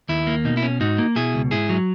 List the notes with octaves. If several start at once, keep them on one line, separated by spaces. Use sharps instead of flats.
D#2 E4
A#3
B2 D#4
E4
C#4
G#2 D#4 F#4
A#3
B2 E4 G#4
C#2
G#2 E4 G#4
F#3